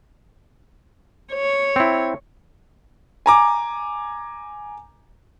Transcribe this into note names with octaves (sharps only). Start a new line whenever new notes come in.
C#5
C4 E4
G#5 A#5 D6